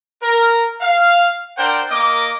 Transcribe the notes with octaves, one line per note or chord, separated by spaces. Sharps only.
A#4
F5
D4 A#4 C5 F#5 G5
A#3 A#4 D#5 D6